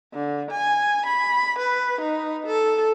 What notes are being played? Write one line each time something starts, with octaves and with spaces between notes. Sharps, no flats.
D3
G#5
B5
B4
D#4
A4